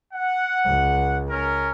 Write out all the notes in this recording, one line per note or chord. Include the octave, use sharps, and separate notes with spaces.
F#5
C#2
C#4 A#4